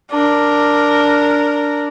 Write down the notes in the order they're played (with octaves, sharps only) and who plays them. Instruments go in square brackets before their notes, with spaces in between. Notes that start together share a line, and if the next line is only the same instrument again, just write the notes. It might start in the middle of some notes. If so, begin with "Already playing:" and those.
[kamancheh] D4 A#4